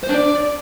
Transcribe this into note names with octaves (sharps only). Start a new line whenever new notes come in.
C5
D4
D5